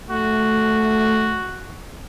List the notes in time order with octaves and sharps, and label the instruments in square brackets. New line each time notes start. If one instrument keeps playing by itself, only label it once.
[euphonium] A3 [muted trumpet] F#4